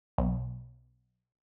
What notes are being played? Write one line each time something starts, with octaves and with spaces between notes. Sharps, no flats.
B1